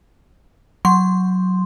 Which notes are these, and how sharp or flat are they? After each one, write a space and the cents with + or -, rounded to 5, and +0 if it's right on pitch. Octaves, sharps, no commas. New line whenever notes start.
F#3 +0 C6 +0